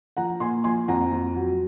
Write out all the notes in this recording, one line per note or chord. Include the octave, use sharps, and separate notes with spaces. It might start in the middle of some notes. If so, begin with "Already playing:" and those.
F3 F#5 A#5
A#2 G#5 C6
F3 G#5 C6
F2 F#5 A#5
F2
F#3